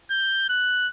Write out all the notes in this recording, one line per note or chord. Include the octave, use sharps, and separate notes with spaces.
G6
F#6